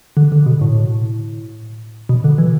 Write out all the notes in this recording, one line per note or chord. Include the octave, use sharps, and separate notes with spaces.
D3
D3
B2
A2
B2
D3
E3